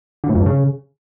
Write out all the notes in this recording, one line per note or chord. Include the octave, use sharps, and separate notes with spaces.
D3
A2
F2
G2
C#3